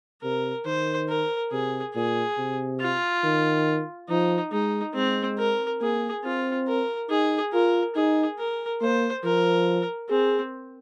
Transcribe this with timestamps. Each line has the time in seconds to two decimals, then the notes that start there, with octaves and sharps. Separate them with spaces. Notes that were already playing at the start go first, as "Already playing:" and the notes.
0.23 C3 A#4
0.66 D#3 C5
1.09 A#4
1.52 C3 G#4
1.95 A#2 G#4
2.38 C3
2.81 F4
3.24 D#3
4.10 F3 D#4
4.52 G#3 D#4
4.95 G#3 C4
5.38 A#4
5.81 A#3 G#4
6.24 C4 F4
6.67 A#4
7.10 D#4 G#4
7.53 F4 A#4
7.95 D#4 G#4
8.38 A#4
8.81 A#3 C5
9.24 F3 A#4
10.10 C4 G#4